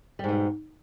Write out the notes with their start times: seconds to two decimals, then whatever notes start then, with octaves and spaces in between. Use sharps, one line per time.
0.19 G3
0.24 G#2
0.28 B2